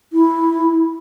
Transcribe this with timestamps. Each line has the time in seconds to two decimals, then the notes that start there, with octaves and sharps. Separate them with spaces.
0.13 E4